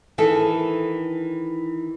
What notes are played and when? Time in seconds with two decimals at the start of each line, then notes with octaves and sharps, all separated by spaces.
0.18 D#3 E3 G#4 A4